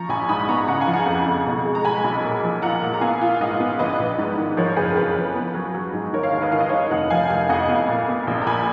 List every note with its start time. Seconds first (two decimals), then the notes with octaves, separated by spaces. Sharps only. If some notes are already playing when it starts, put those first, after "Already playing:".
Already playing: F3 A#5 C#6
0.09 A#1 G#5 B5
0.29 G#2 B5 D#6
0.48 B3 A#5 C#6
0.68 C#3 F#5 A#5
0.80 F5 G#5
0.87 F3
0.93 F#5 A#5
1.06 F2
1.26 F2
1.46 B2
1.65 G#3
1.75 A#5
1.85 G#3 G#5 B5
2.04 B1
2.24 A#2
2.43 F3
2.62 F4 F#5 A#5
2.82 A#2
2.94 A#5
3.01 B3 F5 G#5
3.21 F4
3.34 F5
3.40 G#2 D#5 F#5
3.60 B3
3.79 A#1 B4 D#5
3.99 A#1
4.18 G#2
4.37 D#3
4.57 F3 A#4 C#5
4.76 F#1 G#4 B4
4.90 A#4
4.96 F2 G#4 B4
5.16 F3
5.36 B3
5.54 F#3
5.74 F#3
5.93 G#2
6.13 D#3 A#4 C#5
6.23 C#5 F5
6.33 D#2
6.42 B4 D#5
6.52 D#3 F5
6.60 D#5
6.69 D#3 C#5 F5
6.91 F1 D#5 F#5
7.10 F3 F5 G#5
7.30 F1 F5 G#5
7.49 F2 D#5 F#5
7.68 B3 F5 G#5
7.88 A#2
8.08 B3
8.27 A#1
8.42 A#5
8.47 A#2 G#5 B5